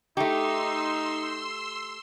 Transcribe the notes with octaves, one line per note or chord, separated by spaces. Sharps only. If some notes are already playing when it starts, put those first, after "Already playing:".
A3 D#4 G4 C6 E6